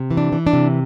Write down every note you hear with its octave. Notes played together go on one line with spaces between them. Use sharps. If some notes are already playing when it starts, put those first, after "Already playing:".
Already playing: C3
E3
D4
E3
D4
C3